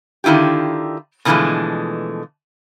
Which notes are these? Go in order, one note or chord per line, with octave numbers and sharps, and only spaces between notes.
D3 D#3 E4 F4 G4
B2 D3 E3 F3 G#3 A3